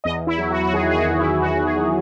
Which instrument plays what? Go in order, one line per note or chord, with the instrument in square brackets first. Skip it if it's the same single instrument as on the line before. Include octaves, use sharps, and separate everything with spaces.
[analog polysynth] E2 D#5
E4
F#3
F#4
F#4
D#3 G#4
G#4
F#4
E2
E4
E2 F#4
G#4
F#3